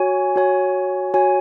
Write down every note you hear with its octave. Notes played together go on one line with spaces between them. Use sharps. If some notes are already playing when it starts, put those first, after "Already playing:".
Already playing: F#4 C#5 G#5
F#4 C#5 G#5
F#4 C#5 G#5